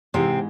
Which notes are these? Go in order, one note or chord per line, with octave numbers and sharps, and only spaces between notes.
G#2 C3 E3 G#3 C4